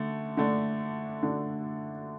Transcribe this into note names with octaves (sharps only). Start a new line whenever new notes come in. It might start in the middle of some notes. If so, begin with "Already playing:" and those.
Already playing: D3 A3
D3 A3 D4
D3 A3 D4